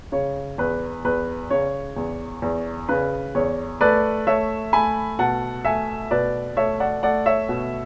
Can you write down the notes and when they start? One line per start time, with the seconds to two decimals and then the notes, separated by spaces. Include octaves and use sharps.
0.12 C#3 C#5
0.58 E2 B4
1.05 E2 B4
1.51 C#3 C#5
1.96 E2
2.42 E2
2.89 C#3 B4
3.35 E2 C#5
3.81 A3 B4 D5
4.27 A3 C#5 E5
4.73 A3 G#5 B5
5.19 B2 F#5 A5
5.65 A3 E5 G#5
6.11 B2 B4 D5
6.57 A3 C#5 E5
6.80 D5 F#5
7.03 A3 D5 F#5
7.26 C#5 E5
7.49 B2